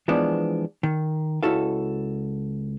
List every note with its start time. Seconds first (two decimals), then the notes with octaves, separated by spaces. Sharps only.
0.08 E3 F3 G#3 B3 D4
0.83 D#3
1.43 C#2 D3 E4 F#4 A4 F5